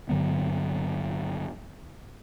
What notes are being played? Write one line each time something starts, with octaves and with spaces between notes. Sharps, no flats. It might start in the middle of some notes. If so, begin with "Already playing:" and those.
G2 D3 F#3 B3